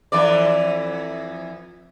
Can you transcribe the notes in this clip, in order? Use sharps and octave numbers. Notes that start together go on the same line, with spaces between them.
F2 E3 D5